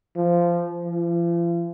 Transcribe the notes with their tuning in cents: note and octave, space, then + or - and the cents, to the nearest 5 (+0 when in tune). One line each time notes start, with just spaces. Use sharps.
F3 -15
F3 -45